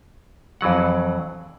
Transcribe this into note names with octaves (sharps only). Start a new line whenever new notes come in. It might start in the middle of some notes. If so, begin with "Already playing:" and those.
F2 E3 F#3 F#5